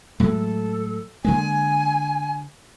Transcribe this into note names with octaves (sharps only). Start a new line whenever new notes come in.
A2 F#3 G#3 A4
D3 G#3 A#3 G#5